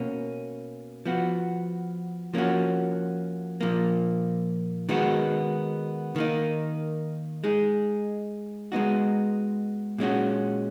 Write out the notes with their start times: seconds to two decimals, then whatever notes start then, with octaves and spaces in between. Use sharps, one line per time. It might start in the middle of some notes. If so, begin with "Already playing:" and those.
Already playing: B2 A#3 C#4
1.05 F3 B3 F#4
2.34 F3 A#3 C#4 F#4
3.61 A#2 F3 A#3
4.89 D#3 G#3 B3 F#4
6.16 D#3 A#3 D#4
7.44 G#3 D#4 G#4
8.72 G#3 B3 D#4 F#4
9.98 A#2 G#3 C#4 F#4